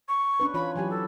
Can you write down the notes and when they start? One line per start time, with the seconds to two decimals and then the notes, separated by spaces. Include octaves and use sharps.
0.08 C#6
0.40 C#4 D4 B4
0.54 E3 F4 C#5 B5
0.76 E3 F#3 G4 G#5
0.90 A4